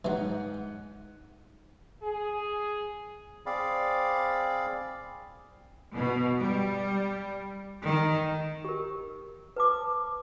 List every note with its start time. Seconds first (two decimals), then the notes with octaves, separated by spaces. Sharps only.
0.05 G#2 E3 F#3 D#4 F#5
2.02 G#4
3.46 C4 G#4 D5 F5 B5
5.92 B2
6.39 G3
7.85 D#3
8.64 G4 A#4
9.56 B4 A5 D6